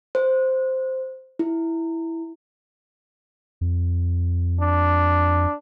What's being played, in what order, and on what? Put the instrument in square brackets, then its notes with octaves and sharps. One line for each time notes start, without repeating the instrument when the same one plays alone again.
[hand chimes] C5
E4
[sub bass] F2
[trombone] D4